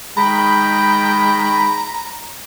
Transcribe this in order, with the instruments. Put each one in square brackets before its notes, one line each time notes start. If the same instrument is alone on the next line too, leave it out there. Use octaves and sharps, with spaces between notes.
[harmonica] D#3 G5 [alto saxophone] G#3 [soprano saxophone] A#5 [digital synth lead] B5